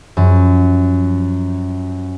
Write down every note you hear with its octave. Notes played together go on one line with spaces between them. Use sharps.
F#2 F3